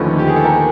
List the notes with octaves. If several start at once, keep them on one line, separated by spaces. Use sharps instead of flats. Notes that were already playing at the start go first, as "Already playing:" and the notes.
Already playing: D#2 D3 F3 A3 C#4 B4
G4
G#4
A4
A#4